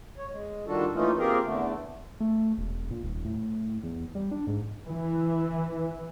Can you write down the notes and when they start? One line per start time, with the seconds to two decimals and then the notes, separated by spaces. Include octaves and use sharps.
0.18 C#5
0.32 G#3
0.67 D#3 G3 D4 F4 F#4 A4
0.94 E3 A3 A#3 C#4 D#4 F4
1.18 A#3 C4 F4 G4 G#4 A#4
1.44 E2 D3 A3
2.20 A3
2.58 E1
2.91 A#2
3.04 D#1
3.25 A2
3.83 E2
4.15 G3
4.31 D4
4.47 G#2
4.86 E3